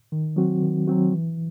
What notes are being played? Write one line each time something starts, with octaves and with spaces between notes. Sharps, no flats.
D#3
F#3 C4 F#4
D#3
F#3 C4 F#4
E3